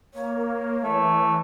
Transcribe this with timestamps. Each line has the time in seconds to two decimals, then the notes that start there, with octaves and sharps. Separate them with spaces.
0.14 A#3 C#5
0.83 E3 A3